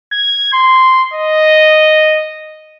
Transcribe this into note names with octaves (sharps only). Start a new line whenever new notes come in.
G#6
C6
D#5